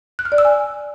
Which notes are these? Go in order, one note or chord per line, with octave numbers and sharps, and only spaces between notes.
F#6
F6
D5
E6
G#5